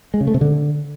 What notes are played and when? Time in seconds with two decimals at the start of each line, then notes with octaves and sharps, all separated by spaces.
0.14 G#3
0.21 C#3
0.27 A3
0.34 C3
0.41 D3